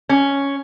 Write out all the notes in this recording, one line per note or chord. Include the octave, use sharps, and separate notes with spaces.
C#4